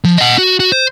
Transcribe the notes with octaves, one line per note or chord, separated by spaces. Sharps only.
F3
D#5 F#5
F#4
F#4
C5